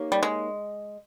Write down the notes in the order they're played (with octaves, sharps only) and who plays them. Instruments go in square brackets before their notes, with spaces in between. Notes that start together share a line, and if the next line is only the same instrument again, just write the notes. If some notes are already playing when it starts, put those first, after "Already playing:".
Already playing: [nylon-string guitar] A#3 D#4 G4 C#5
[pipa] G3
G#3